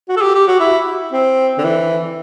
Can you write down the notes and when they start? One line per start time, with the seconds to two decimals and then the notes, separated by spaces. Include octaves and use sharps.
0.09 F#4
0.17 A4
0.21 G4
0.35 G4
0.48 F#4
0.60 E4
1.12 C4
1.58 D3
1.64 E3